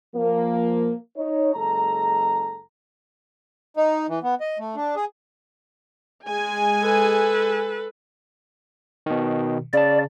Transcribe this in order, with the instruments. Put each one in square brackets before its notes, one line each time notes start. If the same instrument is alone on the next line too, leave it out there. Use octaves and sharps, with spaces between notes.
[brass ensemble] F3 A#3
D#4 C#5
F#1 G#3 A4 A5 A#5
[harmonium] D#4
E3
B3
D#5
A3
D4
G#4
[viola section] G#3 G#5
[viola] A4 B4
[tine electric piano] B2 D#3
[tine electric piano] C#3 A5 [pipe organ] D5